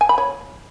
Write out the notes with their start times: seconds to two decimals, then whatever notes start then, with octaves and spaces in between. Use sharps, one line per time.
0.01 G#5
0.09 B5
0.18 C#5